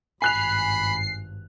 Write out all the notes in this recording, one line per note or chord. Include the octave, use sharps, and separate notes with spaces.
G#1 G2 G#5 B5 F#6 C7 F7